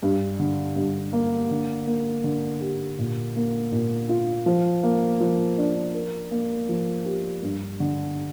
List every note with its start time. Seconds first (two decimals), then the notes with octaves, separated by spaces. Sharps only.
0.03 G2
0.39 D3
0.76 G2
1.13 A#3
1.51 D3
1.87 A#3
2.24 D3
2.61 G4
2.99 A#2
3.36 A#3
3.72 A#2
4.09 F4
4.46 F3
4.83 A#3
5.20 F3
5.58 D4
5.94 A#4
6.31 A#3
6.69 F3
7.05 G4
7.43 G2
7.80 D3